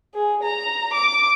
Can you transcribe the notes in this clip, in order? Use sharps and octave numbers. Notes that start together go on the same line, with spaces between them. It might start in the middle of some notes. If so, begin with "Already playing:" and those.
G#4
A#5
D6